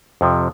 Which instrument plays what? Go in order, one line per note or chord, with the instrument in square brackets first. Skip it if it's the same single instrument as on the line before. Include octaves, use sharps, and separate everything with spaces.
[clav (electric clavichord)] F2 C3 F3